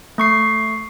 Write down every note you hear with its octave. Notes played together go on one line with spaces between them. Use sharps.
A3 C#6 C7